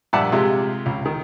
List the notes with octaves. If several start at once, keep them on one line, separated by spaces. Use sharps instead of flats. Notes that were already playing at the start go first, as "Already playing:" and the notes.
A#1 G2 D5 E5 F#5 A5
C3 G#3 F4 G4 E5
C#2
D#3